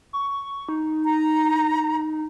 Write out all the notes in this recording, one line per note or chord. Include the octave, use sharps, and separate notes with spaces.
C#6
D#4
A#5